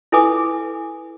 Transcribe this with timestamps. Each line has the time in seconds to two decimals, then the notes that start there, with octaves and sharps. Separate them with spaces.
0.12 E4 A4 B4 G#5 D6 D#6